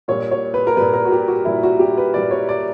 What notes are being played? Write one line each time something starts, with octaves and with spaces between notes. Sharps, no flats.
A#2 G3 C#5
C#5
B4
A#4
A#2 G3 B4
A#4
F#4
G4
F#4
A#2 G3 E4
F#4
G4
B4
A#2 G3 D5
C#5
D5